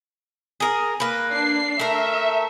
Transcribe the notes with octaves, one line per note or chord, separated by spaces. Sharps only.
G#4 A#4
A#3 B4
D4 C7
A3 A#4 E5